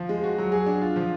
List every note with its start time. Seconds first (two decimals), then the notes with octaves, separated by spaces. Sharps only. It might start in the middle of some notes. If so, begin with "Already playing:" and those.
Already playing: F3
0.09 G#3
0.24 F#4
0.38 F#3
0.52 G#4
0.66 D4
0.82 F4
0.96 F3